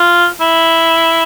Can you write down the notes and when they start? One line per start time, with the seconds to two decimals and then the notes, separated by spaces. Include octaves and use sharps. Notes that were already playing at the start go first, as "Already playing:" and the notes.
Already playing: F4
0.41 E4